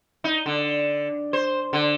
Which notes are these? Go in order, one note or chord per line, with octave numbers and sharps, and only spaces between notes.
D#4
D3
C5
D3